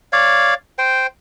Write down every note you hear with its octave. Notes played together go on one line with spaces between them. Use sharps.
C#5 D5 F5
C5 G5